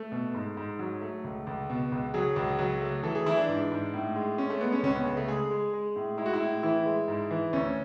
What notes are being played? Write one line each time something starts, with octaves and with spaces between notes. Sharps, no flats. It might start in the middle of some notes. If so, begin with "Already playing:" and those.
Already playing: A3
B2
G#2
G#2
F#3
A3
C#2
C#2
B2
C#2
F#3 G#4
C#2
F#3
A3
E3 A4
G#4
E3 E4
D4
G#2
G#2
A2
G#3
G#3 C#4
A3
G#3 B3
C#4
C#2 C#4
B3
C#3 B3
A3
G#3 G#4
G#3
G#3
A2
G#3 E4
F#4
E4
A2
E3 E4
G#3
G#2
E3
D2 C#4